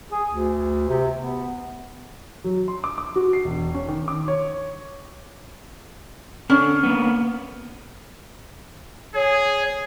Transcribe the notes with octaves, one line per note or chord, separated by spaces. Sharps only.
G#4
D2
C3
B3
F#3
C6
D6
D6
F#4
C7
E1
C#4
D#3
D6
C#5
D3 C#4 D4
A#3 B3
G#4 C#5